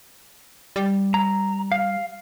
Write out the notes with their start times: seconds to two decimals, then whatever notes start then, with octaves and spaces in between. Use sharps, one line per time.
0.76 G3
1.14 A#5
1.72 F5